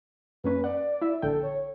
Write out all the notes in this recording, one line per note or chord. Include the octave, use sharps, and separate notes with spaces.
F#2 A#3 C#4 B4
D5 F#5
E4 E5
A#1 D3 A4 G5
C#5